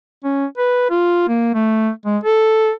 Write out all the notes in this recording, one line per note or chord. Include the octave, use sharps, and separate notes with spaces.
C#4
B4
F4
A#3
A3
G#3
A4